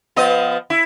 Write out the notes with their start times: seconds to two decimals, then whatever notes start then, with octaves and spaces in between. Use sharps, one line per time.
0.16 F3 B3 D#5
0.70 E4